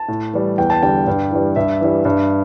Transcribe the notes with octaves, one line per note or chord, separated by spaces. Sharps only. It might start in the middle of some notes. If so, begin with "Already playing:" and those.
Already playing: A5
A2
E3 G3
E2 G5
A5
D3 G3 G5
G2
E3 G3
G2 E5
E3 G3
G2